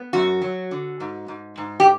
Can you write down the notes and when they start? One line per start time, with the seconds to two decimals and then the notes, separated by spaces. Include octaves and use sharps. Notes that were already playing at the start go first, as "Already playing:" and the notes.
Already playing: B3
0.13 F#2 F#4
0.42 F#3
0.71 D3
1.00 G#2
1.28 G#2
1.58 G#2
1.80 G4